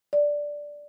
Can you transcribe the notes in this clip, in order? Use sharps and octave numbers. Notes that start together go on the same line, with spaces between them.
D5